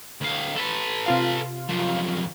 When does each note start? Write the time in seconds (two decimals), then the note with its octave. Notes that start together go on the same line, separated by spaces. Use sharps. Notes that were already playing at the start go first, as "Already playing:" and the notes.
0.21 D2 F5
0.56 A4 B4
1.06 C3 F4 F5
1.69 F#2 F3